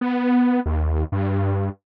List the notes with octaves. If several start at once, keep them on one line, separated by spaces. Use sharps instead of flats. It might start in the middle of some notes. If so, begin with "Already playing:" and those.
B3
D#2
G2